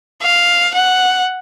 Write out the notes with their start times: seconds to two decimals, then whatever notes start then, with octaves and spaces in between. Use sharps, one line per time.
0.22 F5
0.74 F#5